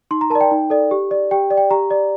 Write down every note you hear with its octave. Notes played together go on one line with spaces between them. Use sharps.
D#4 C6
A#5
A#4 A5
D5
G5
D#4
A4 D5
G4
D5
G4 G5
D5
G5
G4 A#5
D5